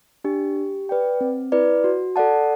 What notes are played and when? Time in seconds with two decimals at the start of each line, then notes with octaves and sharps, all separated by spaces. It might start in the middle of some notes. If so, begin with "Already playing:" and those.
0.24 D4 G4
0.56 G4
0.89 B4 D5 G5
1.21 C4
1.52 E4 B4 D5
1.84 F#4
2.16 A4 D5 F#5 A5